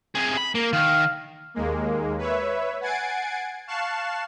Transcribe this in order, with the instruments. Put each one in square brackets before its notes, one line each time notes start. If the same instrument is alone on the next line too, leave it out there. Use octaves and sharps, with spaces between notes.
[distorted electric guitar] C3 G#4
B5
A#3
[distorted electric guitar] D#3 [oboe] F5
[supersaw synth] D#2 G#3 A#3
B4 C#5 E5
F#5 G#5 G#6 A6 C7 D7
F5 A5 C#6 F#6 C7 E7